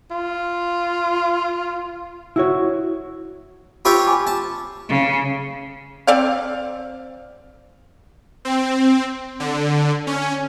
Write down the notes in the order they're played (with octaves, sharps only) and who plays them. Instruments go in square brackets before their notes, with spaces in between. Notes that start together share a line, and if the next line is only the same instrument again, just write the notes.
[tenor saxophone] F4
[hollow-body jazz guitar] E4 F#4 C#5
[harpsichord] F4 G4 C#5 [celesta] B5 E6
[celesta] G#5 B5 D6
[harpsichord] A5
[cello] C#3
[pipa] C4 D5 F5
[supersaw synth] C4
D3
C#4